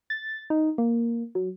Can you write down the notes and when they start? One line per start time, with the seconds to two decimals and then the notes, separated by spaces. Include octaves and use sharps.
0.10 A6
0.50 D#4
0.78 A#3
1.35 F#3